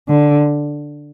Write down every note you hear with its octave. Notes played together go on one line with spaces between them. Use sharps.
D3